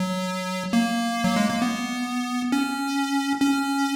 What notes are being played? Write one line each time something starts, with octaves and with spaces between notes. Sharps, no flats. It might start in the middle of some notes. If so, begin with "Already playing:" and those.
Already playing: F#3
A#3
F#3
G#3
A#3
B3
C#4
C#4